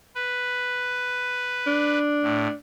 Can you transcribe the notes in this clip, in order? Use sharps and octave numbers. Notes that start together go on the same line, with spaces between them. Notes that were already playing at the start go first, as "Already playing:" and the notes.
B4
D4
A2